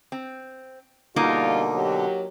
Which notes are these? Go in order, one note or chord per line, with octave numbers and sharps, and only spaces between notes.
C4
B2 D3 G3 A#3 D4 D#4 F4 A#4
F#3 G4